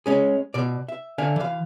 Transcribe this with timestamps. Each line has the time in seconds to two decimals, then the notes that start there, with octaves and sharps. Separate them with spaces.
0.06 G#3 C#4 G#4
0.54 B2 D5
0.88 E5
1.18 D3 E5 F5 G#5
1.36 E3 F5